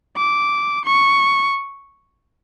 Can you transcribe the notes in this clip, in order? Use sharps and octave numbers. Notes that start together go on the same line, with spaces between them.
D6
C#6